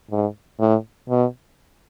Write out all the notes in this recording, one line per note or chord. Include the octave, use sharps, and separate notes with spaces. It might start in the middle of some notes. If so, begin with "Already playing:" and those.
G#2
A2
B2